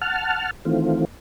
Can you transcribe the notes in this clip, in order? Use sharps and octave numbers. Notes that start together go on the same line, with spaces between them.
F#5 A5 F6
D#3 E3 A3 C4 F4